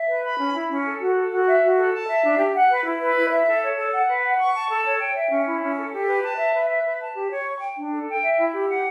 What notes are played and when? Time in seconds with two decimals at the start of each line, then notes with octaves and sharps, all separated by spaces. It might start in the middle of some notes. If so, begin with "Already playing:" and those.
Already playing: E5
0.09 B4
0.24 B5
0.38 C#4
0.55 E4
0.69 C#4
0.85 A4
1.01 F#4
1.15 A4
1.31 F#4
1.46 E5
1.62 F#4
1.77 A4
1.93 A5
2.09 E5
2.24 D4
2.38 G4
2.55 F#5
2.69 B4
2.85 E4
3.00 B4
3.16 E4
3.31 E5
3.47 A4
3.62 C#5
3.77 A4
3.92 F#5
4.07 B4
4.23 F#5
4.38 C#6
4.53 A5
4.69 A4
4.85 C#5
4.99 G5
5.15 E5
5.30 C#4
5.46 E4
5.61 C#4
5.77 A4
5.92 G4
6.08 B4
6.23 A5
6.37 E5
6.54 B4
6.69 E5
6.84 B4
6.99 A5
7.15 G4
7.31 C#5
7.45 C#6
7.61 G5
7.77 D4
7.92 A4
8.08 G5
8.22 E5
8.38 E4
8.53 G4
8.68 F#5